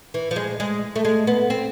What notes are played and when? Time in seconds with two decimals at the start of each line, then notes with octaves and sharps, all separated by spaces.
0.14 E3
0.31 F3
0.36 G#3
0.60 G#3
0.96 A3
1.05 G#3
1.27 B3
1.50 C4